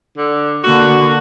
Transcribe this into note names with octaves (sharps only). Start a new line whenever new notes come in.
D3
D3 A#3 F#4